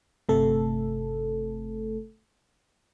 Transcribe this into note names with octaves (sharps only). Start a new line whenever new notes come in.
G1 C3 A3 A4